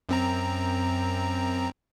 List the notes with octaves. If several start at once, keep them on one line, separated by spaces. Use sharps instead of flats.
F#2 C4 A#5